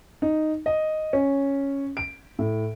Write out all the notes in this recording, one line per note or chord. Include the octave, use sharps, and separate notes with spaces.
D#4
D#5
C#4
D7
A2